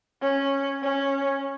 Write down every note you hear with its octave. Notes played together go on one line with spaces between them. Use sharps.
C#4
C#4